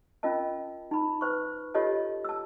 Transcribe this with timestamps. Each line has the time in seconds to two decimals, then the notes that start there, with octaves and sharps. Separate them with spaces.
0.23 C#4 F4 A#4 D#5 A5
0.91 D#4 B5
1.21 B4 C5 C#6
1.74 F4 G4 A4 C#5 D#5 A5
2.25 A5 E6